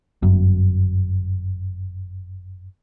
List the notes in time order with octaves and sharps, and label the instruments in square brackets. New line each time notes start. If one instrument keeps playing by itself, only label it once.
[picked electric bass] G1 F#2